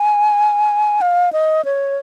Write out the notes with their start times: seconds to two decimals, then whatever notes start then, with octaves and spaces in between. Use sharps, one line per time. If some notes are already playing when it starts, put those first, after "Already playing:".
Already playing: G#5
1.01 F5
1.33 D#5
1.65 C#5